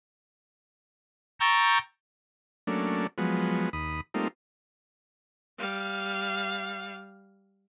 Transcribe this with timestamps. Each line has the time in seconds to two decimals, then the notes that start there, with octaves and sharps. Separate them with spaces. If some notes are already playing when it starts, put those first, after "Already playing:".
1.40 G5 A#5 C#6 E6 G6 A6
2.67 F#3 A3 A#3 C#4 D4
3.18 F3 F#3 G#3 B3
3.73 D#2 B5 D#6
4.14 G3 A3 A#3 C4 D#4 F4
5.59 G3 F5